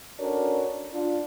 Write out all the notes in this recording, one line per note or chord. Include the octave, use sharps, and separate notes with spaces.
C#4 D4 F#4 A4 A#4 C#5
D4 F4